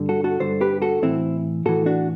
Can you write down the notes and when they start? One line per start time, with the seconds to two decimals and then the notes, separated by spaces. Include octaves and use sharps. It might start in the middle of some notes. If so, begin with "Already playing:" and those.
Already playing: G2 D3
0.09 F#4 A4
0.24 F#4 A4
0.40 G2 D3 A4 C5
0.61 G4 B4
0.82 F#4 A4
1.02 A2 E3 C4 E4
1.65 A2 E3 F#4 A4
1.86 D4 F#4